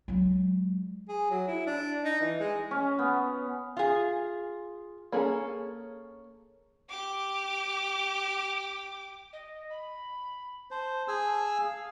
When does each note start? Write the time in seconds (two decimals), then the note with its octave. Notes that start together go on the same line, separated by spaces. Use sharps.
0.08 F#3 G#3
1.09 G#4
1.30 F#3
1.48 E4
1.66 D4
2.04 D#4
2.21 E3
2.40 G#3
2.71 C#4
2.99 B3
3.77 F4 G#4
5.12 A#3 C#4 G#4 A4
6.90 G4 D6
9.33 D#5
9.70 B5
10.71 C5 A5
11.08 G#4 G#5 E6
11.55 F5